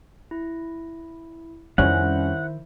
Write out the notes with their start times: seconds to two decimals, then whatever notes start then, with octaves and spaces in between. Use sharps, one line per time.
0.31 E4
1.78 F2 D#3 G3 C#4 E4 C5 E5 F#5